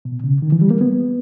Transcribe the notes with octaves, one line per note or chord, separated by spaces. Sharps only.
B2
C#3
D#3
E3
G3
A#3
B3